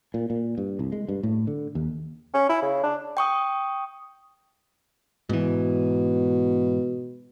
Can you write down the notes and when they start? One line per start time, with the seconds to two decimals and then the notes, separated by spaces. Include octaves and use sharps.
0.14 A#2
0.30 A#2
0.58 G2
0.79 C2
0.92 G#3
1.09 G2
1.23 A2
1.47 D3
1.75 D#2
2.34 C#4
2.50 E4
2.62 C#3
2.84 D4
3.17 G5 C#6 D#6
5.29 G#2 B2 E3